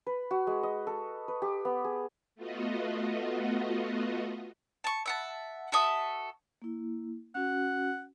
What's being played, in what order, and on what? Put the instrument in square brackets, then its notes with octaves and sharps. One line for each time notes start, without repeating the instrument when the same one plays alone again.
[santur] B4
F#4
G#3
D#5
A4
B4
G4
B3
G#4
[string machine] A3 B3 F4 F#4 D#5
[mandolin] A5 C#6
E5 F#5 A5
F#4 A4 E5 D#6
[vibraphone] A#3 E4
[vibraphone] C#4 F#4 [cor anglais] F#5